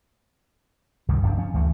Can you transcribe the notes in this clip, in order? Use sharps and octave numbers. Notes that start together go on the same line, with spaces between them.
C2 G2 D#3
F1 F2 D4
F3 C#4
D2 E3 F3 A3